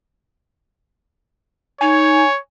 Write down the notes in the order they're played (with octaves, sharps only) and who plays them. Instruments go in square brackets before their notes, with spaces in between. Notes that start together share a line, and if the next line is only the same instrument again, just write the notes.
[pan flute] D#4 [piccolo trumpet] C#5 [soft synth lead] G#5